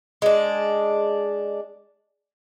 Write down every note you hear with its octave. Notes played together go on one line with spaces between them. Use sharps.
G#3 D4